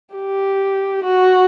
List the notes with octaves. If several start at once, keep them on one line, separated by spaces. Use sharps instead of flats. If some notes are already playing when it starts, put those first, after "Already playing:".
G4
F#4